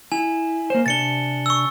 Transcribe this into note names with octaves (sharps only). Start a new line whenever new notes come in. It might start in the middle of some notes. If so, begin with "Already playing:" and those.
E4 G#5
A#3 C5
C3 D4 A6 C#7 G7
C#6 E6